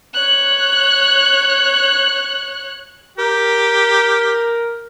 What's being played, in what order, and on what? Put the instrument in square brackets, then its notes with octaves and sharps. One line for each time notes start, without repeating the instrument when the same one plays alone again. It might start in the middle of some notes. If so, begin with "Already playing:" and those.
[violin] C#5 F#6
[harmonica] G4 [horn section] A#4